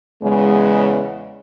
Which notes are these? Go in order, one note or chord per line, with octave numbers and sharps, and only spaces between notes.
E2 C#3 G#3